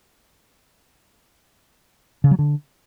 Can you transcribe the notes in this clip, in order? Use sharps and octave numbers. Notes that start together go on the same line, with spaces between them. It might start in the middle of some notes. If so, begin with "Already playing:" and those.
C#3
F#3
D3